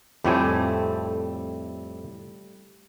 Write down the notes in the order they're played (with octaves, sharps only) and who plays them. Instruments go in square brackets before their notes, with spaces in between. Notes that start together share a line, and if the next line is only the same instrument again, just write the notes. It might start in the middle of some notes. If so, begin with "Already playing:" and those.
[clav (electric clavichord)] F2 A2 G#5 [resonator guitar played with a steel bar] G3 A3 C4